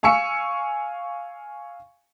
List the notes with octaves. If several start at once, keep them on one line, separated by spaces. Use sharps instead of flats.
F5 G#5 C#6 E6 C#7